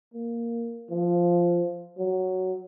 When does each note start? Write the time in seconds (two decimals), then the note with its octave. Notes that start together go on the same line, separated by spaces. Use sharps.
0.14 A#3
0.90 F3
1.98 F#3